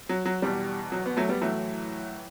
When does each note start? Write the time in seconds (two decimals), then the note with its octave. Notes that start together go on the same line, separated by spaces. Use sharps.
0.09 F#3
0.26 F#3
0.42 E2 B2 G3
0.92 F#3
1.06 B3
1.17 F#3 A3
1.29 G3 B3
1.42 A2 E3 F#3 A3